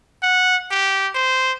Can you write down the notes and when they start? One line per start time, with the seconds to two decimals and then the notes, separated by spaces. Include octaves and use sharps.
0.23 F#5
0.71 G4
1.15 C5